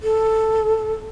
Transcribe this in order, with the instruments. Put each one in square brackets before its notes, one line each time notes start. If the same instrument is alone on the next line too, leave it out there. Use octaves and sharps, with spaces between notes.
[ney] A4